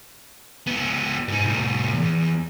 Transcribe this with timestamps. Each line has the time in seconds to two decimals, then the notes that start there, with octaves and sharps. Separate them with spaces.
0.67 C#2 B3
1.28 G#2 D#4
1.43 C2 A2
1.94 E2